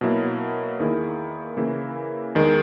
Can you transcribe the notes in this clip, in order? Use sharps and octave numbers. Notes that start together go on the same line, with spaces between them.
B2 F#3 A#3 E4
E2 D#3 A#3 E4 G#4
C#3 E3 A#3 E4
E2 D#3 G#3